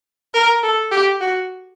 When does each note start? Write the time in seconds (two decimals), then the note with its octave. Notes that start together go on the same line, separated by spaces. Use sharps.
0.34 A#4
0.63 A4
0.91 G4
1.21 F#4